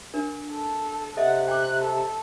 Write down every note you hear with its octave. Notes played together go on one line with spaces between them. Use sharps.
D4 A#4
A4
C3 A4 D#5 E5 F#5
G5 D6 F#6
A4